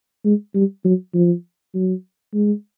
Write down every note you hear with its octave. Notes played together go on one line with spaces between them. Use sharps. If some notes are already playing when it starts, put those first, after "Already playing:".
G#3
G3
F#3
F3
F#3
G#3